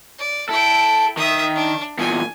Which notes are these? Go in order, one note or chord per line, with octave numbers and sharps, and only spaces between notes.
D5
E4 A4 G5
D#3 E5 D#6
D4
E2 A#2 G#5